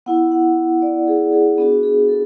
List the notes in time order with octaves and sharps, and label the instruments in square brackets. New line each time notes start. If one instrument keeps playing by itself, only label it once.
[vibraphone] B3 E4 F#5
F#5
D5
G#4
G#4
B3 D4 F#4 G#4
F#4
G#4
G#4
A4